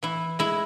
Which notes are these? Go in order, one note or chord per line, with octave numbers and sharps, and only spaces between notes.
E3 E4
G#3 E4